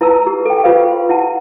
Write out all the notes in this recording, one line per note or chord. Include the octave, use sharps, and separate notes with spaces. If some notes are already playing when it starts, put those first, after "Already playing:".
E4 B4 A5 A#5 E6
G4
A4 G5
F4 G4 B4 C5 F5
C6
E4 F#5 A5